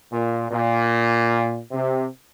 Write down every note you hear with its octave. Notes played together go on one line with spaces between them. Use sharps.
A#2
A#2
C3